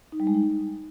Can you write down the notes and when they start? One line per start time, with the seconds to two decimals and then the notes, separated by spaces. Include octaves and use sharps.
0.12 D#4
0.20 G3
0.27 G#3
0.34 D#4